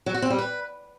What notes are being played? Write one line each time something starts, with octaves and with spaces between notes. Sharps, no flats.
F#3
F#4
C4
G3
B4